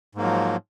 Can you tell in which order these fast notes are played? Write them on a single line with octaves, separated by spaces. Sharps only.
G#2 A#3 F#3 F3